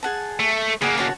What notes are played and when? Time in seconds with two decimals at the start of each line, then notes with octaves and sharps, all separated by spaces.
0.03 G#4 F#5 A5
0.40 A3
0.82 C#3 A#3 G#4 F#5
0.98 F#4 C#5 A5